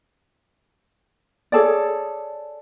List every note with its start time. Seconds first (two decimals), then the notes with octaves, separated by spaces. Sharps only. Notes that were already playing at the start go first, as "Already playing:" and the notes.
1.52 G#4 A4 C#5 D5